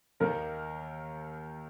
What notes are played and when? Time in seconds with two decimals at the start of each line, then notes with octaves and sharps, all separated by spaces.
0.20 D#2 D#3 A#3 A#4